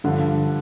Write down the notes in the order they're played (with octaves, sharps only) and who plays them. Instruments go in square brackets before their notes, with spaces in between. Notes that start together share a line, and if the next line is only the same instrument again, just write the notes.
[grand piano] G2 D3 F3